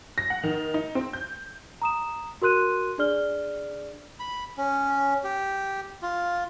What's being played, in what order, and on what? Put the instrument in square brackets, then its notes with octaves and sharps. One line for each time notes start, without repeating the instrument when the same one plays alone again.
[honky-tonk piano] A#6
F#5
D#3
D#4
C4
G6
[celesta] A#5 D#6 E7
F#4 A#4 C6 F#6 D#7
D4 G#4 D5 F6 G7
[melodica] B5
C#4
G4
F4